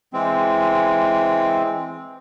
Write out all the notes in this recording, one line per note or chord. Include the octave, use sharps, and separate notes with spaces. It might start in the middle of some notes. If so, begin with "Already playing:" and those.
E3 G#3 C4